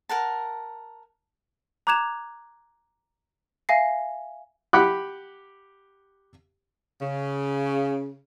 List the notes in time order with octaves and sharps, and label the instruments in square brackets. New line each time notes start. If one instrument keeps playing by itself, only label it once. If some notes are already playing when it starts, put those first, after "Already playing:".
[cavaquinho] A#4 F#5 A5
[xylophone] A#5 D6 F#6 G#6 E7 F7
E5 F5 G#5 A#6 C7
[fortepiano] G4 F#5 B5 D6 F#6
[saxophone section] C#3